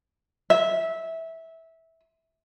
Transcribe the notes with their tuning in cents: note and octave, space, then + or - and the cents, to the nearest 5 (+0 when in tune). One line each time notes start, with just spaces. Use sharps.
E5 -15